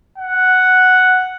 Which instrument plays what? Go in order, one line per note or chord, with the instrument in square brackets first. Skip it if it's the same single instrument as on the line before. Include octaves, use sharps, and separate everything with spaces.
[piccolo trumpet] F#5